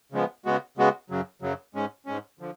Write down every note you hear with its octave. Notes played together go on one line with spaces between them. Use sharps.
C#3 F3 G#3 B3
C#3 G#3 B3 F#4
C#3 G#3 B3 F#4
F#2 C#3 F#3
F#2 C#3 F#3
G#2 G#3 C#4
G#2 G#3 C#4
D3 F3